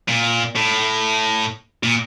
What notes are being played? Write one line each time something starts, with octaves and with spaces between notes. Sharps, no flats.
A#2
A2
A#2